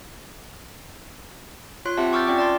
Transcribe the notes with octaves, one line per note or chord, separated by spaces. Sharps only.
F4 C#5 C6 F#6
C4 F4 G4 E5 F#5 A5
C#6 D6 E6 F6 G6 A6
C#4 F4 D5 G5 C#6 D6
D5 A5 C6